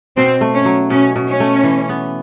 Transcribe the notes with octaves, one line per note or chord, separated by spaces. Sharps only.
B2 C4
A3
C#4
F#3
B2 C#4
B2
C#4
A3
E3
B3